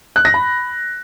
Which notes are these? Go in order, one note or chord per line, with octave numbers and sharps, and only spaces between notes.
F#6
A#6
B5